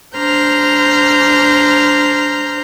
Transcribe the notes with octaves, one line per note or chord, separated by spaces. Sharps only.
D4 C5 A#5 F6 G6